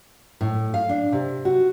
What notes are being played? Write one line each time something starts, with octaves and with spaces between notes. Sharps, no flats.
A2
F5
D4
C3
F#4